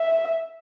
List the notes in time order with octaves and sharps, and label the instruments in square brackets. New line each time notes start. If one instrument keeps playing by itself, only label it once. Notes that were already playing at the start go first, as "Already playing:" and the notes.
Already playing: [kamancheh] E5